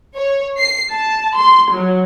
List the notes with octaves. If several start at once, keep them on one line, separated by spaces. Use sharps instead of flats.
C#5
C7
A5
C6
F#3